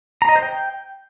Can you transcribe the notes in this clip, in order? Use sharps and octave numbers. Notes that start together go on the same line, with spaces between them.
A#5
D#5
C5
G5